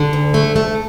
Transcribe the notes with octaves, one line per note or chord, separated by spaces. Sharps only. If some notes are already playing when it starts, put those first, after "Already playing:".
Already playing: D3
D2
A3
A3